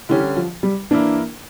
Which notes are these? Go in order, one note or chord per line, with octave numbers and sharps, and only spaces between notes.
D3 E3 G3 C#4 G4
F3
G3
E3 A#3 D4 E4 A#4